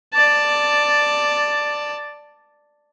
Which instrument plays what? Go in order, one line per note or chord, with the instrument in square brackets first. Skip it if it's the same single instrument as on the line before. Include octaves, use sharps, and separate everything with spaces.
[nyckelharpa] D5 A5